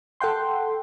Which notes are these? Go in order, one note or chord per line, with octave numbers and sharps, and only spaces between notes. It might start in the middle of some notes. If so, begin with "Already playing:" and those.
A4 F#5 G5 C6